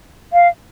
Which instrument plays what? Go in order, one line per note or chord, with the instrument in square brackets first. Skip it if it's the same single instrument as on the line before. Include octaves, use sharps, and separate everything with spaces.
[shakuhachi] F5